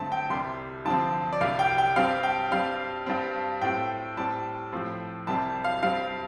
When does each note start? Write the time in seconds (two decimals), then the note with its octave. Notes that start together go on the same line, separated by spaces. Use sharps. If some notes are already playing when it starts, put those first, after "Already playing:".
Already playing: G2 D3 A3 C4 A5
0.12 G5
0.30 C2 C3 G3 C6
0.85 G2 D3 F3 C4 A5
1.33 D5
1.41 C2 C3 G3 F5
1.59 G5
1.78 G5
1.96 G2 G3 C4 F5
2.23 G5
2.51 G2 G3 C4 F5
3.06 G2 G3 C4
3.61 A2 A3 C4 G5
4.17 A2 G3 C4 A5
4.72 A2 F3 A3 C4
5.27 C2 C3 G3 C4 A5
5.64 F5
5.83 G2 G3 C4 F5